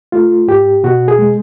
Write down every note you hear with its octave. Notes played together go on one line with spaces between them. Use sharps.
A3 F4
G#2 G4
B2 F#4
G#4
G#3